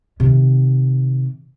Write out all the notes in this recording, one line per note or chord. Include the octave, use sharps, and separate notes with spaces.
C3 D#3